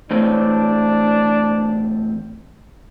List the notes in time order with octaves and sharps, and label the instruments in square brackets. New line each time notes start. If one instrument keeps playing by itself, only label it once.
[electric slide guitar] E2 A2 C4 [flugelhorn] D4